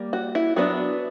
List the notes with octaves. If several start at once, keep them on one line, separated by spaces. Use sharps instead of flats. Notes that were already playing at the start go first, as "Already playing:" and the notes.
Already playing: G3 A#3
F#4
E4
F#3 B3 D4 F#4